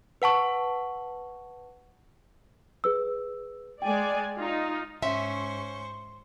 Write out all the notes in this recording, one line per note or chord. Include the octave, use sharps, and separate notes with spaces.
B4 F#5 A5 C#6
G#4 B4 E6
G#3 D5 G5 G#5
D#4 F4
G#2 C#4 C5 E5 C6 C#6